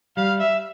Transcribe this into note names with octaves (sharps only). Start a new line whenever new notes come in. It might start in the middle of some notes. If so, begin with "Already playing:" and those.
G3 F5
E5